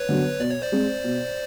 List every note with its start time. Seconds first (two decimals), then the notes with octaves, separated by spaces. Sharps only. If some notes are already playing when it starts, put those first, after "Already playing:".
Already playing: B4 C#5
0.09 D3 F#3 B3
0.40 B2 D5
0.51 C#5
0.62 C5 D5
0.72 G#3 C4
1.04 B2